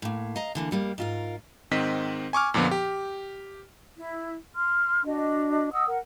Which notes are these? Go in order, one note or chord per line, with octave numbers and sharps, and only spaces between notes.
A2 A#3
D#5 F5 A#5
D3 E3 A#3
F2 G3 A#3
G#2 F4 A#4
G#2 D#3 C4 D#5 B6
G#5 C#6 D6 F6
F2 A#2 D3 F3 B3
G4
E4
C6 F6
D4 F#4 D#5
D#5 F#5 D#6 E6
A#4 F#5